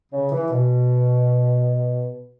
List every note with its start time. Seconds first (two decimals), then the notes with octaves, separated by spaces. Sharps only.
0.12 C#3
0.32 E3
0.52 B2